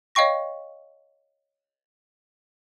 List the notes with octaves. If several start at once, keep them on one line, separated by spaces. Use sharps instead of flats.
C#5 D#5 F5 G5 C#6 A#6